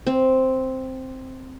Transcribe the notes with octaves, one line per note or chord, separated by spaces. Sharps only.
C4